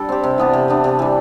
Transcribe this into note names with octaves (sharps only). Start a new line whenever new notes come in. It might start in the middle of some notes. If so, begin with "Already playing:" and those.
Already playing: G3 D4 A4
C4 G4
C3
E3 B3 D4
C3
E3 B3 D4
C3
E3 G3